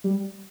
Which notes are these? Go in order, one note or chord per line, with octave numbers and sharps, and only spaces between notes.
G3